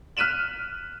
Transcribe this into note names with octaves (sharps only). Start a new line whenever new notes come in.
F6 F#6 B6 D#7 E7 F#7